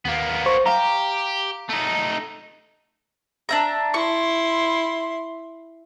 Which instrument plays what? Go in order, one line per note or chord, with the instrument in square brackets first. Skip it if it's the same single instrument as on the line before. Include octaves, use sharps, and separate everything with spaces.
[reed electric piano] D#2 [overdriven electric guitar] A#3 B3
[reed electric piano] C5 C#6
[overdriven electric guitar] G4 [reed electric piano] F5 A#5
[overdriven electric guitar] A3 D#4
[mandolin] D4 E5 A#5
[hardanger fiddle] E4 C6 [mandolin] C#6